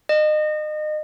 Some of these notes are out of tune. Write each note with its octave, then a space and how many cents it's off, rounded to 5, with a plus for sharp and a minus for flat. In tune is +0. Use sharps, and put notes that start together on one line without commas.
D#5 -30